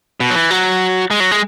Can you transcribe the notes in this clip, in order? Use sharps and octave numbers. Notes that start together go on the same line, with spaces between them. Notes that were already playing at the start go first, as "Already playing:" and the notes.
B2
F#3
E3
F#3
G#3
F#3
G#3